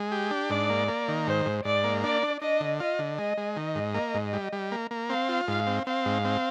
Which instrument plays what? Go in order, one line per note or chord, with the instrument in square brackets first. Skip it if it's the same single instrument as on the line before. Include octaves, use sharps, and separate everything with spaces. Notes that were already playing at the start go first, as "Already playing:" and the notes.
Already playing: [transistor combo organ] G#3
G4
D4
[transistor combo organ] G#2 [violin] D5
[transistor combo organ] A#3
A#3
D#3
[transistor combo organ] G#2 [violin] C5
[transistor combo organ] G#2
[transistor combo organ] G#2 [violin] D5
[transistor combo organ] A#3
[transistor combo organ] D4 [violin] D5
[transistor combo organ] D4
[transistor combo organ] D4 [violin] D#5
[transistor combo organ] D3
[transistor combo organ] F4 [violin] D#5
[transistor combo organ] D3
[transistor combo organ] G#3 [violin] D#5
[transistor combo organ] G#3
[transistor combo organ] D#3 [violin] D#5
[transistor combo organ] G#2
A#3
G#2
G3
G3
A#3
A#3
[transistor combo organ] C4 [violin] F5
[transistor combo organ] F4
[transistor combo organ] G#2 [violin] F5
[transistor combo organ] C4
[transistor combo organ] C4 [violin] F5
[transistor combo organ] G#2
C4